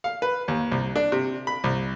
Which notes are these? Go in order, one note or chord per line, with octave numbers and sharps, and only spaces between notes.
F5
B4
D#2
C2
D4
C3
B5
C2